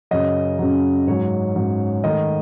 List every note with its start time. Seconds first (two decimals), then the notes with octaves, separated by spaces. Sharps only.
0.11 F#2 C#3 F#3 D#5
0.59 F#2 C#3 F#3
1.07 G#2 F#3 C#4 C#5
1.56 G#2 F#3 C#4
2.04 G#2 D#3 A3 D#5